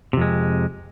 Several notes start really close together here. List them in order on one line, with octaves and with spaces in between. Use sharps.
C3 F2 G#3